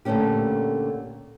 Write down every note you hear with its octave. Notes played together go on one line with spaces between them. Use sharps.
A#2 D3 A3 B3 C#4 G4